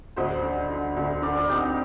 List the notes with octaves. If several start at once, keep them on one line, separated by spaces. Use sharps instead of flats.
D2 C5 D#5
D3
D3
D2
D3 A#4 D5
A#4 D5
C4 D#4 G4
D#4